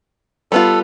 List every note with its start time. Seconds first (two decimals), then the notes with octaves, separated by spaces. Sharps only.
0.52 G3 B3 F4 A4